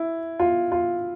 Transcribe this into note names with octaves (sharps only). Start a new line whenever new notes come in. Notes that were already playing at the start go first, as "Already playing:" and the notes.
Already playing: E4
F4
F4